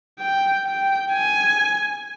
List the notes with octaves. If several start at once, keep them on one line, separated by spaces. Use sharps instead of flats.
G5
G5
G#5